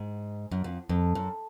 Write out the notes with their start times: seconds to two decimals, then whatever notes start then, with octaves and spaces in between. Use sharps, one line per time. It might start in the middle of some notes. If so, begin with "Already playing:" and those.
Already playing: G#2
0.51 F#2
0.64 F2
0.89 F2
1.15 F#2